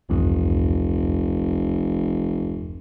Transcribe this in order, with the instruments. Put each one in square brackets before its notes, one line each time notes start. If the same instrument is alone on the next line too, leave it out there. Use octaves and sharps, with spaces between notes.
[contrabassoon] F1 [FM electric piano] B1 E2 G2